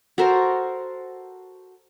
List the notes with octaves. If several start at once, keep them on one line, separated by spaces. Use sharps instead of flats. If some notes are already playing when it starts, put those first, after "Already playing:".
F#4 A4 A#4 C5